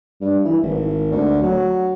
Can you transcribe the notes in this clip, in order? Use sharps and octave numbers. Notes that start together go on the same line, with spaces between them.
G2
E3
G#1
D2
F#3